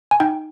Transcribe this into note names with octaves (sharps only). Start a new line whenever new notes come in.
G#5
D#4 G5